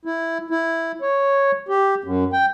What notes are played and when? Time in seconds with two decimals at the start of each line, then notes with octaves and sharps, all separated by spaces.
0.05 E4
0.51 E4
1.01 C#5
1.69 G4
2.04 F#2
2.33 G5